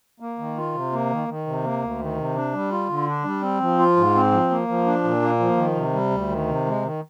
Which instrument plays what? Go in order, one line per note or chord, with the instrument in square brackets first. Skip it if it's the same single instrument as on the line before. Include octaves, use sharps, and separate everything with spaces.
[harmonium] A#3
D#3
F4
C3
A#3
D#3
D#3
C3
A#3
D2
D#3
C3
D4
G3
F4
D3
D4
G3
C4
F3
F4
G#2
C4
F3
A#3
F3
D4
A#2
A#3
F3
D#3
C3
G3
D2
D#3
C3
G#3
D#3